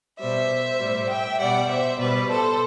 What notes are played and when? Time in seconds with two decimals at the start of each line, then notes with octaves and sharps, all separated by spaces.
0.19 B2 G3 C5 E5
0.80 A2 G3
1.09 E5 G5
1.39 B2 G3 D5 F#5
1.69 C5 E5
1.98 B2 G3 B4 D5
2.29 A4 C5